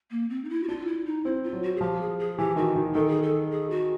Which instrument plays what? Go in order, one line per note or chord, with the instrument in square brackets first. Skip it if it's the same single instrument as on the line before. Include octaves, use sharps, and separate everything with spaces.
[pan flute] A#3
C4
D#4
E4
F#4
[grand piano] D4 [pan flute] F4
[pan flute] E4
D#4
[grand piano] C4 [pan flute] E4
[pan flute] F4
[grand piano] F#3
[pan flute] F#4
G#4
[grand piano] F3 [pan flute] G4
[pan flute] G#4
G#4
[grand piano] E3 [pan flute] G4
[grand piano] D#3 [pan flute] F#4
[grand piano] D#3
[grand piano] D#3 [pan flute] A4
[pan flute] G#4
A4
G#4
F#4